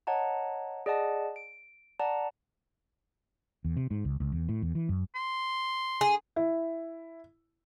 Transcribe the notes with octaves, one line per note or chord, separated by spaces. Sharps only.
C#5 D#5 F#5 A5 A#5
G#4 D5 D#5 F#5 A5
D7
D5 F#5 A5 A#5
E2
C3
G#2
C#2
C#2
E2
A2
E2
E3
F#2
C6
G#4
E4